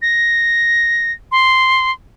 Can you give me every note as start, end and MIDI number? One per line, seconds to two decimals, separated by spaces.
0.02 1.12 94
1.32 1.91 84